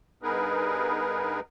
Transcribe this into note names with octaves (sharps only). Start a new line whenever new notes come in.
G2 B3 D#4 G#4 A#4 B4